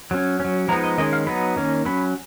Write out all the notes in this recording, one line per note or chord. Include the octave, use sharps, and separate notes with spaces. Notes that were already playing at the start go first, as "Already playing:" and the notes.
F#3 C#4
F#3 C#4
F3 G#3 B3 D#4 A#5
D#5
D#3 G#3 C#4 D#5
F5
F#3 B3 D#4 B5
D#3 A#3 C#4
F#3 C#4 B5